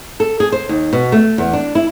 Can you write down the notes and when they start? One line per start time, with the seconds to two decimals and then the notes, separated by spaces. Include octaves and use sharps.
0.20 A4
0.40 G#4
0.52 C5
0.69 D#2
0.93 B2
1.12 A3
1.38 E2
1.53 D4
1.75 E4